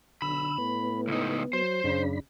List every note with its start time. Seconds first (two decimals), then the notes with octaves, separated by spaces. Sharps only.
0.22 B1 D3 B5 E6
0.58 A2 B3
1.08 C#2 D#4
1.53 F#3 C5
1.84 F#2 C#3 D4 B5